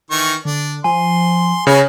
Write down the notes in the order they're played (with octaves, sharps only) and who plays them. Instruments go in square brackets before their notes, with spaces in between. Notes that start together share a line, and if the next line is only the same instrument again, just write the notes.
[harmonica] D#3 E3 C#6
[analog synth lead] D3 [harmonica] D4
[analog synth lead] F3 [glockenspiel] G#5 [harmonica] C6
[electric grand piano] C#3 C#5 [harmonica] G#4 B4 [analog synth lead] A#6